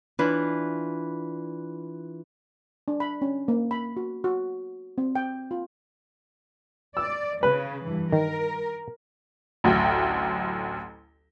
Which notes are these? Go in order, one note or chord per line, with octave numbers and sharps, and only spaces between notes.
E3 D4 F4 B4
D4
B5
C#4
A#3
B5
F#4
F#4
C4
G5
F4
D5 E6
C#3 B4
G2 E3
D#3 A#4
A1 D2 F#3 G5